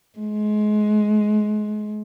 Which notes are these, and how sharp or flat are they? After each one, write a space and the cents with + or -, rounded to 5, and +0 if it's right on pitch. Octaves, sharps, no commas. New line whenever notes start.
G#3 +30